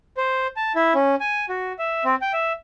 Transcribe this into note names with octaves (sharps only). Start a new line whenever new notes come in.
C5
A5
E4
C#4
G#5
F#4
E5
C4
G5
E5